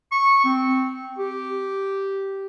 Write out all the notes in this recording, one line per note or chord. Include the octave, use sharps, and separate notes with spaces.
C#6
C4
G4